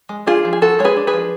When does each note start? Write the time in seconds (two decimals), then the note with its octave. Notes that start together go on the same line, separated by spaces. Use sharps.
0.09 G#3
0.26 D4 F4 G#4
0.45 F3
0.53 G#4
0.61 F3 F#4 A4
0.79 G#3 C#5
0.85 G#4 B4
0.96 D4
1.07 G#4 B4
1.13 F3